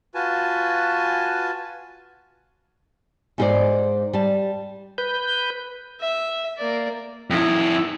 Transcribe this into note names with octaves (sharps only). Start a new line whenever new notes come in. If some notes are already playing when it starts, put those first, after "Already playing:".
F4 F#4 B4 G#5 A5
G#2 D#4 G4 A#4 C5 D5
G3 A5
B4 G6
E5
A#3 D5
F2 E4